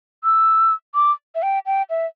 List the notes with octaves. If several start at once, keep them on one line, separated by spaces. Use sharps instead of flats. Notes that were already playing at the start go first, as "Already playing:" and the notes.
E6
D6
E5
G5
G5
E5